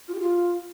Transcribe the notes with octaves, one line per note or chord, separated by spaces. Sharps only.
F4
G4
F4